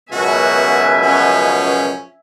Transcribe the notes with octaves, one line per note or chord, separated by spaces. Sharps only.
C#2 F#2 B2 F#4 E5 G#5
F3 C#4